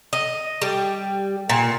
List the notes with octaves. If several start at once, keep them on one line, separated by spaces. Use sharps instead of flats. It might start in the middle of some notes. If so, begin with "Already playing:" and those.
D#5
G3
A#2